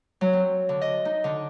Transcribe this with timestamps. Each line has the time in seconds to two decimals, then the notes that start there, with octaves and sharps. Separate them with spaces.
0.21 F#3
0.33 C4
0.69 D3
0.82 D#5
1.05 D#4
1.24 D3